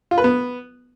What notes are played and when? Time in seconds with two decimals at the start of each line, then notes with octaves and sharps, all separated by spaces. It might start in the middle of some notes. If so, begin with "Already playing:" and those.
0.11 F4
0.18 B4
0.24 B3